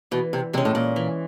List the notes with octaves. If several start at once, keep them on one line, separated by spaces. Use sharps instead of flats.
B2 E3
C3
C3 G#3 C#4
A2
A#2
E3